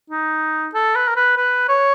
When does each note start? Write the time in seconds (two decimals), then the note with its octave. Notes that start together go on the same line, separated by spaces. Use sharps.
0.11 D#4
0.74 A4
0.96 B4
1.08 A#4
1.16 B4
1.37 B4
1.69 C#5